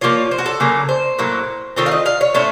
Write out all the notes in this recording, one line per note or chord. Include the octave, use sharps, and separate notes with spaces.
F3 A#3 F4 C#5
C5
F#4
A4
C#3 F#3 A#3
C5
A2 F#3 A#3
D#3 A3 C4 F4 C#5
F5
D#5
F5
C#5
A2 A3 C#4 C5